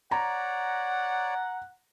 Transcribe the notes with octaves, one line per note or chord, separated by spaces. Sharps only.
C#5 D5 F#5 A#5